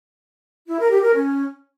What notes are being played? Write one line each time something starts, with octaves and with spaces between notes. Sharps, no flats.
E4
A#4
G4
A#4
C#4